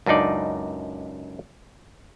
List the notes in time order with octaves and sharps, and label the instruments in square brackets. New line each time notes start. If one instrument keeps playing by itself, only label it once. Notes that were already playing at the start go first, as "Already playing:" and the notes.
[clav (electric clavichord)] C#2 F#2 D4 D#4 D5